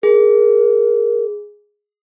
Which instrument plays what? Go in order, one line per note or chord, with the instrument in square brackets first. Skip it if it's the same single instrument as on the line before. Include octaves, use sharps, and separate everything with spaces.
[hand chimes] G#4 [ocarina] A#4